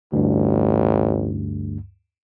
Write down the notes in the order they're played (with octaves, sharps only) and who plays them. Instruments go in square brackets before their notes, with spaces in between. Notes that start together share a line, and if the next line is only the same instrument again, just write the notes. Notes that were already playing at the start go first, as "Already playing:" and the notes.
[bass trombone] A1 [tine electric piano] D2 G2